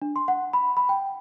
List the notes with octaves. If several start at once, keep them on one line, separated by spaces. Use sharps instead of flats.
D4
C6
F#5
B5
B5
G5